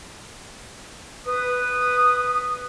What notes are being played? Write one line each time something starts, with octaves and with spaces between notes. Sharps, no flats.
B4 D#6